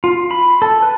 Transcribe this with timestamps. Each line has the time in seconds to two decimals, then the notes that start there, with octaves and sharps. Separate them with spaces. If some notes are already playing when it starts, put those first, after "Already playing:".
0.04 F4
0.31 B5
0.62 A4
0.82 B4